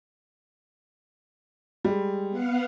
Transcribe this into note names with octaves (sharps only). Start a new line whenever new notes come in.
G3 G#3
B3 F5 F#5